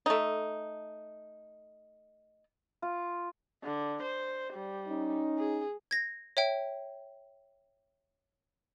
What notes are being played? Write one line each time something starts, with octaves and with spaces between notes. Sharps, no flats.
A3 D#4
F4
D3
C5
G3
C#4 D#4
G#4
G#6 A#6
C#5 E5 G5